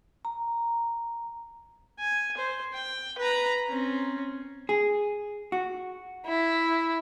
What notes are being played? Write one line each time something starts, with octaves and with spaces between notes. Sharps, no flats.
A#5
G#5
C5
G5
B4 A#5
C4 C#4
G#4
F#4
E4